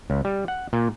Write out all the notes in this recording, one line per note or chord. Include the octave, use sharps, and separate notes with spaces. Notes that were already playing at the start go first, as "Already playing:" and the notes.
C#2
G3
F#5
A#2